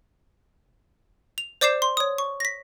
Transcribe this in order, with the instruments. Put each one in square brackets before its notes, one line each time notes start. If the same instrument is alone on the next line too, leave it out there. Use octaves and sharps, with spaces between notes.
[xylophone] F7
C5 D5 D6 G6 C7 E7
C6
C#5 D#6
C#6
A#6 B6